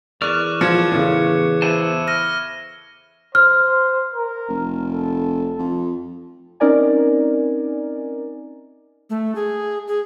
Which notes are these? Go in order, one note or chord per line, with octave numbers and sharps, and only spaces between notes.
E2 A#4 D5 C#6 D6 F6 F#6
F3 C#6 G#6 C#7
E2 A2 C#3
E4 C5 A5 D#7
F6 A#6 D#7
C5 F6
A#4
F1
A4
F2
C4 C#4 D#4 A#4 D5 G#5
A3
G#4
G#4